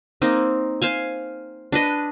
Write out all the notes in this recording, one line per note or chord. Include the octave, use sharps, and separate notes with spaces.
A#3 C4 D#4
C5 F5 G#5
D4 B4 D#5